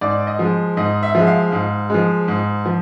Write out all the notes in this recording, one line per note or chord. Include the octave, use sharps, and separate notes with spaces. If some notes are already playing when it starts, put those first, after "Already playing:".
G#2 D5
D#5
F3 G#3
G#2 D#5
E5
F3 G#3
F5
G#2
F3 G#3
G#2
F3